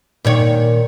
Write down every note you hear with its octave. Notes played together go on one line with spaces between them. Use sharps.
A#2 D#3 C#5